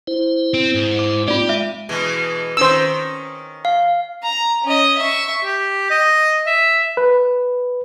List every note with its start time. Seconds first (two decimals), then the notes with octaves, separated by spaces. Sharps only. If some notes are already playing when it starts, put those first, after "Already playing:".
0.07 E4 C5
0.54 C4
0.75 G#2
0.99 D6
1.28 A#3 C4 D#4 F4 G4 D5
1.49 G#3 E5
1.89 B2 E3 G#3
2.57 D#3 C#4 C5 E6
3.65 F5
4.23 A#5
4.64 C#4 D#5
4.98 E5 C#6
5.45 G4
5.90 D#5
6.47 E5
6.97 B4